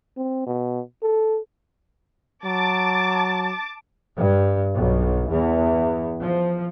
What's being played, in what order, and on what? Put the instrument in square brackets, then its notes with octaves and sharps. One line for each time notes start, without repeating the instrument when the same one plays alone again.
[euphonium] C4
B2
A4
[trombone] F#3 [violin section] A5 D6 A6
[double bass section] G2
B1
E2
F3